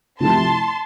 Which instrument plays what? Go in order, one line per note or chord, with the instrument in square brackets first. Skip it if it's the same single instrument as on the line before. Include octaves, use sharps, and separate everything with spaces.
[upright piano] C3 F3 A3 E4 G4 [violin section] A5 C6